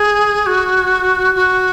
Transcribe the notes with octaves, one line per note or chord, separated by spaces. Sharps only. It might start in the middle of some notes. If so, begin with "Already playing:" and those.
Already playing: G#4
F#4
F#4